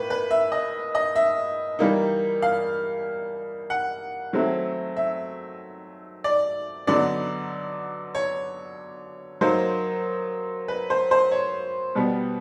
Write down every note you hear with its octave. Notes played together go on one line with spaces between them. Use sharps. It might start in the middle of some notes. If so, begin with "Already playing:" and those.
Already playing: A2 A#3 B4
B4
E5
D#5
D#5
E5
E3 G3 A#3 D#4
F5
F#5
D#3 F#3 A3 C4 E4
E5
D5
D3 F#3 B3 D#4 D5
C#5
F#3 A#3 D#4 C5
B4
C5
C5
C#5
B2 G3 B3